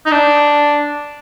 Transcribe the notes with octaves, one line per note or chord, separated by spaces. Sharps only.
D#4
D4